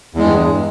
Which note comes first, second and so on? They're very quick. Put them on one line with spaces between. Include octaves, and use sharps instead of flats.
E2 G#3 G2